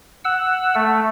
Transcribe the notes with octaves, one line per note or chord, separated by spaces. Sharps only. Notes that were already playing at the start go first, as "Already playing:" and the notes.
F#5 E6
A3